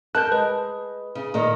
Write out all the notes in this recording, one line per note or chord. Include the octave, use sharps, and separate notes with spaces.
A#4 A5 F#6 G6
G#3 B4
C#3
A#2 D#3 A#3